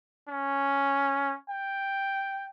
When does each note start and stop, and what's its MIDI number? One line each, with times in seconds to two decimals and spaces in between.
0.29 1.35 61
1.49 2.47 79